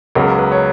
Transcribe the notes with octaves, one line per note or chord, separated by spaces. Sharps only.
C#2 C#3 F#3 B3 A#4
B4
C#5